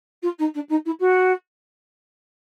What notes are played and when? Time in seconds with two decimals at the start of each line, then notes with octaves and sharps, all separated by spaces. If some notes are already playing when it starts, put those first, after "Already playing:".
0.22 F4
0.38 D#4
0.54 D4
0.69 D#4
0.85 E4
1.00 F#4